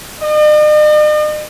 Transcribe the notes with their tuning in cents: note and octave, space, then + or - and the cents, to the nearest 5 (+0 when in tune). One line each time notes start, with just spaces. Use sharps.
D#5 -45